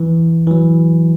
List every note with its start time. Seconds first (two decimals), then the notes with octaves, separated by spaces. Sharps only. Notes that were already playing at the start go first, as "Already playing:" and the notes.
Already playing: E3
0.47 E3
0.51 F#3